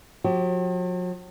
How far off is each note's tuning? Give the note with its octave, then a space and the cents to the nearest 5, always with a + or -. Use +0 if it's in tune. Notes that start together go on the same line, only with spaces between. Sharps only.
F#3 -45 G4 -45